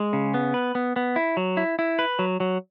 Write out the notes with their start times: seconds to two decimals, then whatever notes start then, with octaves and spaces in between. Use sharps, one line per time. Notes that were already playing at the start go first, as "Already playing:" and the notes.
Already playing: G#3
0.13 C#3
0.34 B3
0.54 B4
0.75 B3
0.96 B3
1.16 E4
1.37 F#3
1.57 E4
1.79 E4
1.99 B4
2.19 F#3
2.40 F#3